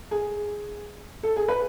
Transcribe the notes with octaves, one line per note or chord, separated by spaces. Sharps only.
G#4
A4
G#4
B4